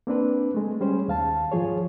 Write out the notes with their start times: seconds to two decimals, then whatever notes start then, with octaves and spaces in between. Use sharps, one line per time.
0.07 A#3 C4 D4 B4
0.54 G#3 A3
0.81 G3 C#4 G#4 C5
1.08 D#2 F5 A5
1.52 G#2 F3 G#4 C#5